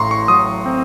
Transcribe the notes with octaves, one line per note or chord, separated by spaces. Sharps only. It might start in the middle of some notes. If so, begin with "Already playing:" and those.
Already playing: A1 A2 A#5 C6 C#6
C#6
F#3 D#6
C4